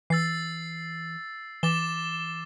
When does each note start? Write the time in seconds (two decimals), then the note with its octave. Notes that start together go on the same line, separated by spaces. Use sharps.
0.10 E3 E6 A6 C7
1.63 E3 D6 A6 E7 G7